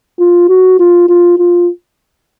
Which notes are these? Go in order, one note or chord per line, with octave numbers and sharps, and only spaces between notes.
F4
F#4
F4
F4
F4